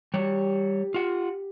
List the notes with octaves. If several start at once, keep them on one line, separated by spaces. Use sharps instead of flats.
G3 G4 C#5
F4 F#5